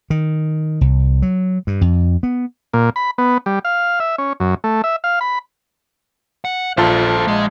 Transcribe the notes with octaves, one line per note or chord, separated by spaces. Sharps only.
D#3
C2
F#3
G2
F2
B3
A#2
B5
B3
G3
F5
E5
C#4
F#2
A3
E5
F5
B5
F#5
A#1 F4 A4 C5 A5
G#3